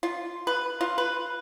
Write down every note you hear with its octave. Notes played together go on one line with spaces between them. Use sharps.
F4
B4
F4
B4